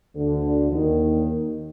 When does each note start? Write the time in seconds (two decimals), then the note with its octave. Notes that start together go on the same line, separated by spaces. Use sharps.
0.15 D2 D3
0.72 D#2 D#3